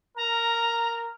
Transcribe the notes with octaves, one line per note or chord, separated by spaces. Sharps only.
A#4 A#5